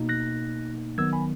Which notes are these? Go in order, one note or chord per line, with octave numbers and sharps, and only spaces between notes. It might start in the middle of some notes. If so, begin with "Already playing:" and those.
Already playing: B2 A#3 D#4
F#6 A#6
D#3 F#3 B3 E6 G#6
G#5 B5